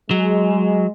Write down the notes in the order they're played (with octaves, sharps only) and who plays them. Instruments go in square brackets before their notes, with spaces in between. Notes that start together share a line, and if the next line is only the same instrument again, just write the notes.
[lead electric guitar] F#3 [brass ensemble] G#3